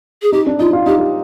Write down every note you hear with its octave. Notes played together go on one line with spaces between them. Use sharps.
G#4
D#4 G4
D4
D#4 F4
F4
D#4 G4
G4